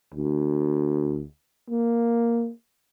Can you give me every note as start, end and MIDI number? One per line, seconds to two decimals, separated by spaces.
0.14 1.23 38
1.70 2.50 58